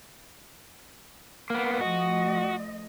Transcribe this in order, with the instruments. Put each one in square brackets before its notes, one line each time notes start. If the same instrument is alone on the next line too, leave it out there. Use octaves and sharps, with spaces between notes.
[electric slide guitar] A#3 B3
[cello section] F3 A3 D#5 [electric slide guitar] F#4